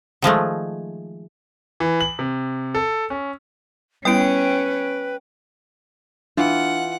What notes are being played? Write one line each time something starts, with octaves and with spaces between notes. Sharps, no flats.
D#3 F3 G#3 A3
E3
F#7
C3
A4
C#4
G3 B3 C#4 E4 B4 G5 D7
E3 D4 F4 F#5